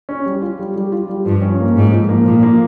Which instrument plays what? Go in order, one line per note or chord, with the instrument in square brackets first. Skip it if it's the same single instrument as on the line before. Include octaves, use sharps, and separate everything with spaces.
[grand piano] C#4
G3
F4
G3
G3
F4
G3
[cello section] G2 [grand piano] F3
[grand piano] C#4
A#3
[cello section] G#2 [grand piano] F3
[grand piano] F3
A#3
[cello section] A#2 [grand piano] F3
[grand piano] A#3